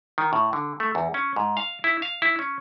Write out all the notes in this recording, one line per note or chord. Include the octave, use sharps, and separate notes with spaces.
D#3
A2
D3
A3
E2
C#4
G#2
F5
E4
F5
E4
C#4